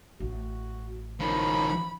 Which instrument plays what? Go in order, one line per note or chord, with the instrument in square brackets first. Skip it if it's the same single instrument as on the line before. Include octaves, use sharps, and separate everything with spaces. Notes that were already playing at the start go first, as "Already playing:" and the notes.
[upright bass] A1 [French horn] F#4
[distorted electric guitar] D#3 F3 [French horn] C#4 [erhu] B5